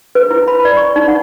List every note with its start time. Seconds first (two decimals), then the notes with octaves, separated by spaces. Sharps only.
0.15 B4
0.31 E4
0.48 B5
0.65 D5
0.77 C#6
0.96 D#4
1.08 F#5